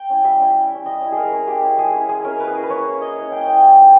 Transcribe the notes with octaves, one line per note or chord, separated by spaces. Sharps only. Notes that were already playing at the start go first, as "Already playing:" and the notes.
Already playing: G5
C#4 E4
G3 E5
C#4 E4
G3
C#4 E4
G3 D#5
C#4 E4
G#3 G#4 A#4
C#4 E4
G#3 G4
C#4 E4
G#3 G#4
C#4 E4
G#3 G#4
C#4 E4 A#4
A#3 B4
G#4
C#4 E4 A#4
B4
A#3 C#5
C#4 E4
A#3 D#5
C#4 E4
A#3 G5
C#4 E4 G5
G3
B3 D#4